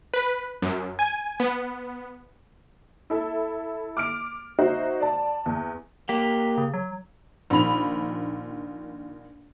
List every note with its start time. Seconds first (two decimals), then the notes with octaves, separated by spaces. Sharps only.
0.14 B4
0.62 F#2
0.99 G#5
1.40 B3
3.10 E4 A4 E5
3.97 D6 F6 D7
4.59 D#4 F#4 C5 E5
5.00 D5 A5
5.46 E2
6.09 A#3 G4 B6
6.58 C#3
6.74 F#3
7.50 A#1 D#3 B5 F7